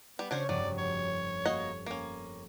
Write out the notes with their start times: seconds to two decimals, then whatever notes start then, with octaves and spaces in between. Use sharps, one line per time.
0.19 G3 B3
0.31 C#3 C#4 D4 F#4 C5 C#5
0.49 F1 G2 F#3 D5 D#7
0.78 C#5
1.46 A#3 F#4 D#5
1.86 A#3 C#4